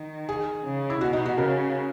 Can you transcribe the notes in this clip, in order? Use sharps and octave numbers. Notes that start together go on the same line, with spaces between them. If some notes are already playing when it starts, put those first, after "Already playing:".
Already playing: D#3
G#4
C#3
E4
B2 F#4
D#4
F#4
C#3 A#4